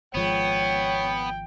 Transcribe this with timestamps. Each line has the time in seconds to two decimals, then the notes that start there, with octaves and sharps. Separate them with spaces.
0.15 G#1 F3 G#3 B3 C#5 G5